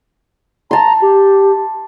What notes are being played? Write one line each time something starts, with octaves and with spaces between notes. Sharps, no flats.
A5 A#5 C6
G4